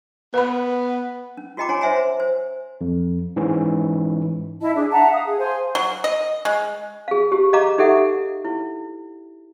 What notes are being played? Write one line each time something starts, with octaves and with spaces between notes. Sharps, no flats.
B3 B4 B5
C#4
F4 F#4 D#5 G5 A#5 D6
C#4 C#5 F#5 G#5 C6
C5 C#5 E5 F#5 G#5 A#5
C5
C5
F2
G#2 E3 C#4
E4 D#5 A5
D4 G#4
E5 F#5 A5 A#5
F5 D#6
G#4
C5 F5 G#5 C6
F#3
D#5
G#3
G#4 F5
G4
D#5 F5 A#5 D6
D#4 G4 A4 E5 F#5
E4